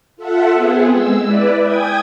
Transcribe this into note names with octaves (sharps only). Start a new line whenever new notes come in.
F4 A4 E5 F#5
B3 C4 G#4
G#3 E6
E4 B4 D5
G5 G#5 D#6 G#6